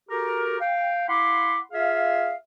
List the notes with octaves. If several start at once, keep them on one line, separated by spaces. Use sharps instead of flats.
F#4 G4 A4 A#4
F5 G5
E4 F5 F#5 B5 C6 D6
F4 G#4 E5 F5